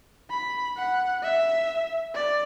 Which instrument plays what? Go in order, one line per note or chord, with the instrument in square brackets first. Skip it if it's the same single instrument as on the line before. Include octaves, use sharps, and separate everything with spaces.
[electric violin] B5
F#5
E5
D5